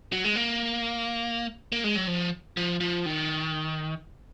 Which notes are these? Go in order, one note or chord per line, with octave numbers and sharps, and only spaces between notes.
F#3
G#3
A#3
A#3
G#3
F#3
F3
F3
F3
D#3